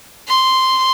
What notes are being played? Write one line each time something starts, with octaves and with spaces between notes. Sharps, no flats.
C6